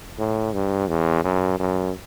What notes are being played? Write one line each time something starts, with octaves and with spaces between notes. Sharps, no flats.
A2
G2
E2
F#2
F#2